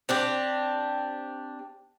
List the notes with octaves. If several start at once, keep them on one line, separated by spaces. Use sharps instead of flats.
C4 D4 G4